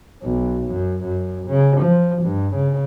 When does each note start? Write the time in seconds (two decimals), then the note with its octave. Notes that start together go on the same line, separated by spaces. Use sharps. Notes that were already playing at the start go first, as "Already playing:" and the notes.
0.22 B1
0.67 F#2
1.04 F#2
1.47 C#3
1.81 F3
2.23 G2
2.55 C#3